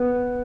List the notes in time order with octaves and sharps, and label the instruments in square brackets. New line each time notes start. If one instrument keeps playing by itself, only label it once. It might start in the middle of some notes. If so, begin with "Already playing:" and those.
Already playing: [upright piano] B3